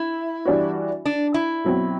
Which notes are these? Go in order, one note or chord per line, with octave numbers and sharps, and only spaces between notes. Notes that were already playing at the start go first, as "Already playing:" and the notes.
Already playing: E4
E3 G3 D4 F#4
D4
E4
B2 F#3 C4